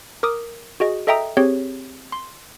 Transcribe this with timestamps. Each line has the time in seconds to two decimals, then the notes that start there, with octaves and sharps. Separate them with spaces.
0.23 A#4 D6 D#6
0.80 F#4 G#4 D#5
1.07 A4 D#5 E5 G5 A#5 D#6
1.37 C4 G4 G#4 C#5
2.12 C6